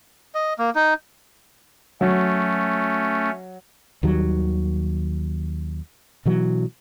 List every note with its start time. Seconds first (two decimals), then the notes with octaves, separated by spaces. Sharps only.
0.35 D#5
0.59 A#3
0.75 D#4
2.01 F#3 A3 C#4
4.03 D#2 D#3 F#3 G3
6.26 B2 E3 F#3